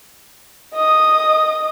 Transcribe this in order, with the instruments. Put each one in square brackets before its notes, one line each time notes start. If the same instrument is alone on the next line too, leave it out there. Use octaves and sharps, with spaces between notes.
[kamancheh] D#5 D#6